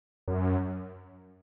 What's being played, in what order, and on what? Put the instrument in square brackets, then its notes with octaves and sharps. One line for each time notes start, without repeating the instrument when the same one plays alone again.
[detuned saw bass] F#2